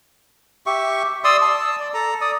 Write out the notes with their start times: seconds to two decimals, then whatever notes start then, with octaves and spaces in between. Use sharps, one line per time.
0.66 G4 E5 C#6
1.24 D5 C6 D#6 E6
1.42 A5 E6
1.80 D5
1.94 A4 A#5
2.21 D5 D#6